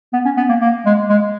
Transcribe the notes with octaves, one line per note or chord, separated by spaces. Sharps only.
B3
C#4
B3
A#3
A#3
G#3
G#3